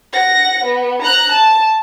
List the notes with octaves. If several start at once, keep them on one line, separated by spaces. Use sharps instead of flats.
F#5 A#6
B3
A#5 F#6
A5